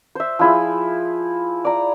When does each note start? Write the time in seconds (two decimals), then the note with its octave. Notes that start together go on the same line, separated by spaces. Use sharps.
0.15 C5 E5
0.39 F3 E4 G#4
1.65 D5 A#5